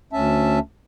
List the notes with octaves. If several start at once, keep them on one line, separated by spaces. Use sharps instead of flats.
D2 C#4 E5 A5